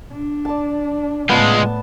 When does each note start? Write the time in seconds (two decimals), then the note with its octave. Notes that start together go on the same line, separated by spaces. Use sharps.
0.12 D4
0.45 D5 A5
1.29 A2 G#3 B3 F4 A5